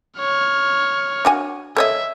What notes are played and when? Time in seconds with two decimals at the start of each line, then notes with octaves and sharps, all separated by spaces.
0.19 C#5 F6
1.25 D4 F#4 G#5
1.77 A4 C#5 D#5 E5